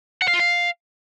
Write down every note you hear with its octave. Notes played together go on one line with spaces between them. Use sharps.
F#5
F5
F4
F5